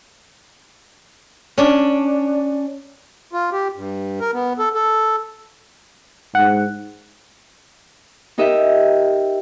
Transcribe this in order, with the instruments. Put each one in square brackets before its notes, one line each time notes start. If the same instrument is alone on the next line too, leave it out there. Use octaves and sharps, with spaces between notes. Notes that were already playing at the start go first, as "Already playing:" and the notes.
[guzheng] C#4 D4
[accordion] F4
G4
G2
A#4
B3
A4
A4
[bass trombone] G#2 [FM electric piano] F#5
[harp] D#4 G4 A#4 D#5 E5